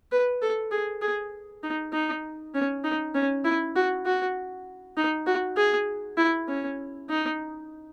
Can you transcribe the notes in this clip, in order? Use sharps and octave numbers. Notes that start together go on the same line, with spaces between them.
B4
A4
G#4
G#4
D#4
D#4
C#4
D#4
C#4
E4
F#4
F#4
D#4
F#4
G#4
E4
C#4
D#4